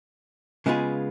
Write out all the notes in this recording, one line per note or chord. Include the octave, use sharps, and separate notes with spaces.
C#3 G#3 B3 F4 G#4